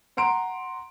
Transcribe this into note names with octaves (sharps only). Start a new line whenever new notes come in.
F#5 A#5 C6 D7